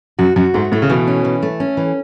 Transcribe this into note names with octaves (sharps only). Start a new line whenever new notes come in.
F#2 F#4
F#2 F#4
G#2 A3
A2 A3
C#3
B2 E3
C#4
E3
A3
C#4
E3